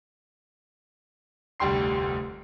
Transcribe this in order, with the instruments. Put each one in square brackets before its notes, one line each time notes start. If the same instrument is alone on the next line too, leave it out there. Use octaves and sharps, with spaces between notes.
[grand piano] F1 D2 G3 G5 C6 C7